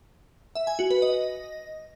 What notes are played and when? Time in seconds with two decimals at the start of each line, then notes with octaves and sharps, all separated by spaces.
0.55 E5
0.67 G#5
0.79 F#4
0.91 B4
1.02 D#5